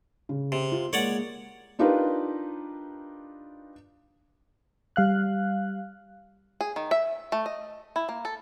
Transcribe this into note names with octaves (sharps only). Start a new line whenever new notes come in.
C#3
C3
F4
G#3 A#3 C#5 D5 F#5
D4 D#4 F4 G4 A#4 B4
G3 F5 F#6
G#4
D#3
E5
A3
D#5
E4
A#3
A4